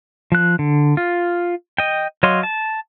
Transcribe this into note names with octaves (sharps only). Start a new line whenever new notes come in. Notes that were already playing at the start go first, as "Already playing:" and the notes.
F3 F#6
D3
F4
D#5 G5
F#3 C#5 D#5 F5 C6
A5